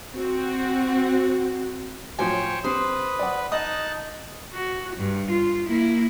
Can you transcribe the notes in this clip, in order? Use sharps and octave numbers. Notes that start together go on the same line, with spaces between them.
C4 F#4
A2 F3 F#3 C5 C#5 G5 G#5
C3 B4 C5 D#6
D5 F#5
D#4 D#5 A5 D#6 F#6
F#4
G2
F4
A#3 E4